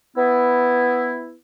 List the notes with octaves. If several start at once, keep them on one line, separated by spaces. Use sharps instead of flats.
B3 E4